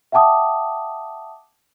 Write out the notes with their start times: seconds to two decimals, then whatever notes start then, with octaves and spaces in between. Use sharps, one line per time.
0.12 E5 F#5 G5 A5 D6 D#6